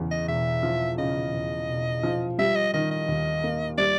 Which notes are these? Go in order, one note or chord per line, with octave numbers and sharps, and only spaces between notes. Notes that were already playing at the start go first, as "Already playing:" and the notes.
Already playing: E2 C#3
D#5
E1 E5
F3
C#3 D#5
E2
E1
F3
G3 E5
D#5
D#3 D#5
D#5
D#2
A#3
G3 D5